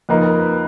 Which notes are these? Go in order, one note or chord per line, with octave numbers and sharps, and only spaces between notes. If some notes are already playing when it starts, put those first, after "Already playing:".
F2 F3 A#3 D#4 B4
A#4
B4